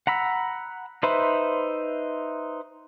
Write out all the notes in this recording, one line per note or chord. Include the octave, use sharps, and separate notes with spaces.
F#5 A#5 B5 E6
D#4 B4 C5 E5 B5